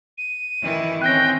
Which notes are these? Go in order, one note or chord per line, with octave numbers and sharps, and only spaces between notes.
D#7
D#3 E3 E4
D#3 C4 C#4 G5 F#6 A#6